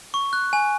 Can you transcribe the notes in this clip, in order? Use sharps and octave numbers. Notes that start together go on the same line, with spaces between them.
C#6
F#6
G#5